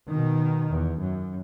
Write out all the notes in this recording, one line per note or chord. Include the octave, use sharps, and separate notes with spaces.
B2 D#3
E2
F#2